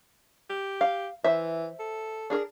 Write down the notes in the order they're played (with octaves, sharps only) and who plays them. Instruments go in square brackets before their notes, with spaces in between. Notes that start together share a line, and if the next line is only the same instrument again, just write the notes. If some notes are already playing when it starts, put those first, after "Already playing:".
[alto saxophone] G4
[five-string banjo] F5
[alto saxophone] E3 [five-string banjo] C5 E5
[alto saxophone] A4
[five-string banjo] D4 G#4 A#4